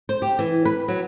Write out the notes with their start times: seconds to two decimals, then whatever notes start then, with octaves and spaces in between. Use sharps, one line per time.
0.09 C5
0.22 G4
0.39 E3
0.65 B4
0.88 F#3